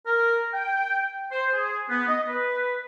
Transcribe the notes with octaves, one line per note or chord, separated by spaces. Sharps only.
A#4
G5
C5
G#4
B3
D#5
B4